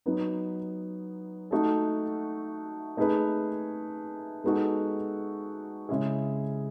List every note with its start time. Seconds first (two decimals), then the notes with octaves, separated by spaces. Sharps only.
0.06 F#3 B3 D#4
1.51 A3 D#4 F#4 A4
2.97 A3 D#4 G#4 B4
4.44 G#3 B3 D#4 F#4 A4
5.89 C#3 G#3 C#4 E4 G#4